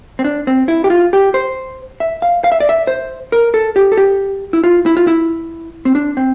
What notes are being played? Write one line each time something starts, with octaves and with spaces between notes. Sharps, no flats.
C4
D4
C4
E4
G4
F4
G4
C5
E5
F5
F5
E5
D5
E5
C5
A#4
A4
G4
A4
G4
E4
F4
E4
F4
E4
C4
D4
C4